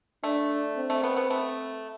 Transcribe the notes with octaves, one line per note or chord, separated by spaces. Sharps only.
A3 D4
C4
A3
B3
B3
A3